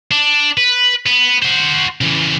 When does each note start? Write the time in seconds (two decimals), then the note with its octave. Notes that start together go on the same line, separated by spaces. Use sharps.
0.11 D4
0.57 B4
1.06 B3
1.42 F#4 C5
2.01 C#3 E3